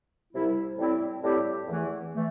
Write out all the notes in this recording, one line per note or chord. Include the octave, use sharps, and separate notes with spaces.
C2 C3 G3 E4
A2 G3 C4 E4 G4
A2 G3 C4 E4 G4
E2 E3 A3
E3 A3